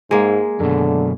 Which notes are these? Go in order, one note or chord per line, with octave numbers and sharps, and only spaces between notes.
G#2 G#3 A#3
F#2 B2 D3